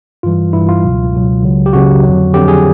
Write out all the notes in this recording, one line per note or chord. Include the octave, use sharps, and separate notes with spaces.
G2 E3 G3 F4
G2 E3 G3 E4
F4
C#2 B2 F#3
C#2 B2 F#3
C#2 C#3 F#3
G4
C#2 C#3 F#3 F#4
F2 D3 F#3
F2 D3 F#3 G4
G#4